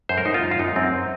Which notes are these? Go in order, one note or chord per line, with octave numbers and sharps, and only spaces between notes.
F#2 C5
A#4
F#2 D#4
F4
F#2
F4
F#2 D#4
F#2 C4